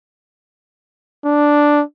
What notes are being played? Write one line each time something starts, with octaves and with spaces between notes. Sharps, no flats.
D4